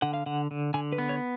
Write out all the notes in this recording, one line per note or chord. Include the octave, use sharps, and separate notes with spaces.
D3 F#5
F5
D3 F#5
D3
D3 G#5
B4
B3
C#5